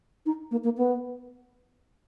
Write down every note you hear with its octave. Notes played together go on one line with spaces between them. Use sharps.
D#4
A#3
A#3
B3